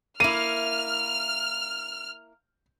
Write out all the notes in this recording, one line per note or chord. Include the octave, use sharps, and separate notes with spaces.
A#3 E4 F6 D#7